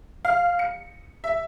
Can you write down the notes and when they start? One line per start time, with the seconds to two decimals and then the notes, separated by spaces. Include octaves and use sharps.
0.25 F5
0.59 C#7
1.24 E5